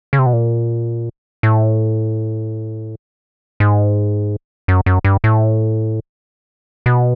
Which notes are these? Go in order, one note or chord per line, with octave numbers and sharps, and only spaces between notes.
C#3
C3
B2
A#2
A2
G#2
F#2
F#2
G2
A2
B2